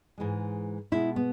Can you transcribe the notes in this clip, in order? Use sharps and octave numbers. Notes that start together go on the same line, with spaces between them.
G#2 E3 G#3
B2 G#3 E4
B3